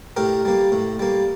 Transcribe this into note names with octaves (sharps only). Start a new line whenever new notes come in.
A2 G4 A#4
G3 A#3
A2
G3 A#3